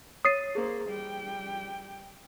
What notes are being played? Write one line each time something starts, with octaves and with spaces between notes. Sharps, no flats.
C#5 D#6 A6 C7 D#7
A#3 G#4 C5
G3 G5